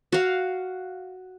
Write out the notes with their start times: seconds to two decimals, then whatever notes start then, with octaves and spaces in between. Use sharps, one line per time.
0.12 F#4 F5